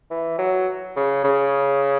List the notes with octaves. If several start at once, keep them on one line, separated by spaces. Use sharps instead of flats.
E3
F#3
C#3
C#3